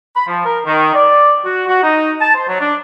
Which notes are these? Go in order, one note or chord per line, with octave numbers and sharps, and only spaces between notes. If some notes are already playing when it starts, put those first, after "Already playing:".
B5
F3
A#4
D#3
D5
F#4
F#4
D#4
A5
C5
F#3
D4